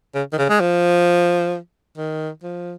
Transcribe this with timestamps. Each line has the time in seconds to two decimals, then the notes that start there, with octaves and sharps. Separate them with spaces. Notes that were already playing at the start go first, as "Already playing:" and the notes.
0.15 C#3
0.33 D#3
0.38 C#3
0.49 G#3
0.61 F3
1.97 D#3
2.43 F3